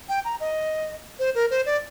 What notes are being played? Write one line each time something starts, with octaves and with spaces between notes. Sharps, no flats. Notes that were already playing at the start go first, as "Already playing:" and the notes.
G5
A#5
D#5
C5
A#4
C5
D5